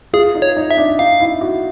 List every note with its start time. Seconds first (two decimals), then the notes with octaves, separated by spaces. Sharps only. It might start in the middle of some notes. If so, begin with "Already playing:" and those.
0.13 F4 G#4
0.35 D#4
0.42 C#5
0.57 D#4
0.71 E5
0.77 D4
0.99 D#4 F5
1.20 E4
1.41 F#4